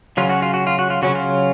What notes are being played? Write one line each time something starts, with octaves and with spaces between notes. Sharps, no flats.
C#3 F#3 C#4 F4
F#4
F4
F#4
F4
F#4
F4
C#3 F#3 C#4 F#4
F4